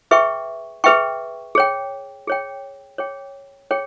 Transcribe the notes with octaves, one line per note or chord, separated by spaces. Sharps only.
G#4 B4 E5 G5 C#6
G#4 B4 E5 G5 C#6
G#4 C#5 G5
G#4 C#5 G5
G#4 C#5 G5
G#4 C#5 G5